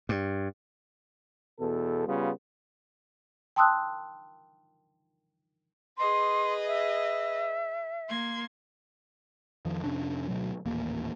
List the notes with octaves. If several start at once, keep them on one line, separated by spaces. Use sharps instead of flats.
G2
E2 B2 A4
C#3 G3 B3 F4 G#4
G5 A5 C6 D#6 E6 F#6
G#4 B4 D#5 C6
E5
A#3 C6 G#6
F2 D#3 F3
F2 C3 C#4 D4
D2 B2 F#3
D#1 A1 D#2 A#3